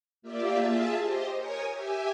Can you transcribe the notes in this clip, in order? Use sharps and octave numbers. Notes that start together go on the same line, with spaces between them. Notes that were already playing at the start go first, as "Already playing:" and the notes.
A#3 F4 G4 D5 E5
F4 G#4 E5 A5
G4 C5 D#5
A#4 C#5 G#5 C#6 D#6
G4 E5 G#5